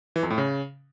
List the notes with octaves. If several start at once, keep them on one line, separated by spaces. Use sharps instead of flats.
E3
F2
A2
C#3